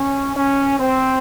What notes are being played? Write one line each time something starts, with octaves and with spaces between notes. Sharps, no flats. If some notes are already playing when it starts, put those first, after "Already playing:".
Already playing: C#4
C#4
C4